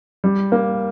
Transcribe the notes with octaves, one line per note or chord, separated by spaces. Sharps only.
G3
A#3